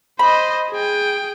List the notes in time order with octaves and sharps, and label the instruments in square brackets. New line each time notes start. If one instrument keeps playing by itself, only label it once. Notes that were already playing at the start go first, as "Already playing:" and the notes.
[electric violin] C5 D#5 [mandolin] B5
[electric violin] G#4 G5